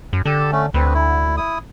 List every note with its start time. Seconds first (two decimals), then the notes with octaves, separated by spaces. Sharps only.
0.13 F#2
0.25 D3 G4 A4 A5
0.52 A3 C#4
0.74 D2 C4 B4
0.94 E4
1.37 E4 D#6